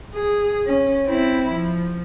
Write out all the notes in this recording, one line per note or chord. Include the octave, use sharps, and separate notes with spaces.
G#4
C#4
C4 E4
F3